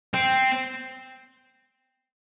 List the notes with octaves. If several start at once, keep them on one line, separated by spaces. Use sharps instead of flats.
C4